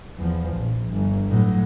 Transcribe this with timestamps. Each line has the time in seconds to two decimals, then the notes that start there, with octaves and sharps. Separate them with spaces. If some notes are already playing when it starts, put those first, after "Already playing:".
0.17 E2 F3
0.56 A#1
0.90 G1
1.28 A2 F#3